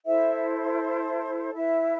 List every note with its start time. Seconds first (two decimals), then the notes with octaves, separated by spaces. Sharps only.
0.05 E4 A4 C5 E5
1.53 E4 B4 E5